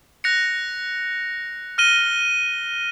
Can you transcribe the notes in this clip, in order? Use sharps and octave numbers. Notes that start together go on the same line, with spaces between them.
F#6 A#6 C#7 F7
F6 A#6 D#7 G7